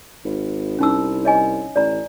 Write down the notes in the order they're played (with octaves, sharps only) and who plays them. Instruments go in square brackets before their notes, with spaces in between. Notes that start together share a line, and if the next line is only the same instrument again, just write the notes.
[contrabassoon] G#1
[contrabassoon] C2 [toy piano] C#4 D#4 E6
[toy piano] C#5 D#5 G#5
[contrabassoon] A1 [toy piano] D5 A#5